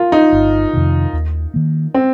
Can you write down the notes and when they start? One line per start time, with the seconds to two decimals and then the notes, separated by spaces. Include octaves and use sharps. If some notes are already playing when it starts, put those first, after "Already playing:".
Already playing: F4 A#4
0.12 D#4
0.32 G1
0.73 F2 C3 D#3
1.13 D#2
1.54 D#3 A#3
1.94 C4